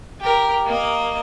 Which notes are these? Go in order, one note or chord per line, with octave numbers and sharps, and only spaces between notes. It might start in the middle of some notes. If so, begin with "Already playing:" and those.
G4 A#4
A#3 D#5